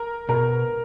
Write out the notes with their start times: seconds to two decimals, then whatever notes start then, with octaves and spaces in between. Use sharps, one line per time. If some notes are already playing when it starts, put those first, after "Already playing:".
Already playing: A#4
0.29 B2 A#4